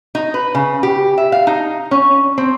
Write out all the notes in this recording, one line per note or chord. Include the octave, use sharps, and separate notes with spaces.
D#4
B4
C#3
G4
E5
F5
D#4
C#4
C4